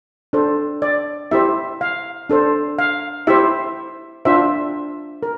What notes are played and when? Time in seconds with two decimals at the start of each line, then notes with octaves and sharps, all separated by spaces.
0.33 D4 A4 C5
0.82 D5
1.31 E4 G4 C5 E5
1.81 F5
2.30 D4 A4 C5
2.79 F5
3.27 E4 G4 C5 E5
4.25 D4 F4 C5 E5
5.23 A#4